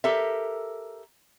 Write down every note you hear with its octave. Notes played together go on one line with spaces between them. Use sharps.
G4 A4 A#4 E5